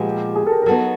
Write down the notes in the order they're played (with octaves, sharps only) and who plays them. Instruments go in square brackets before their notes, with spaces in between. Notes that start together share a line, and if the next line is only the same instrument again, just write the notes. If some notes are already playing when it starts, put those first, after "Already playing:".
Already playing: [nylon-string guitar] A#2 F3 G#3 B3 [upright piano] G4
[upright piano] G#4
A4
A#4
A#4
[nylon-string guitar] F#3 B3 D#4 [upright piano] A4